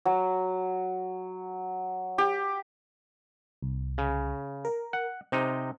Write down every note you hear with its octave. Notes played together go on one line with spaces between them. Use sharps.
F#3
G4
C2
C#3
A#4
F#5
C3 D#4 C5 A#5 G6